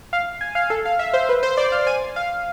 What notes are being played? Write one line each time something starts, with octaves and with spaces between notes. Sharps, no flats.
F5
G#5
F5
A4
F5
E5
C5
B4
C5
D5
F5
G#5
F5